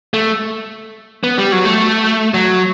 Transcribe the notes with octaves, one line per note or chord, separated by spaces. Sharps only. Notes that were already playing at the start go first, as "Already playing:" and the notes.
A3
B3
G3
F#3
A3
F#3